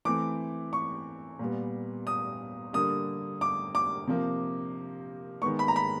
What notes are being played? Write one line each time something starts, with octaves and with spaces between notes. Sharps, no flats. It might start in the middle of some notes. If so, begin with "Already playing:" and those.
E3 A3 C4 D6
C#6
A#2 G3 B3
D#6
D3 G3 A#3 D#6
D6
D6
C3 F3 A#3
D#3 G#3 B3 C#6
B5
A#5
B5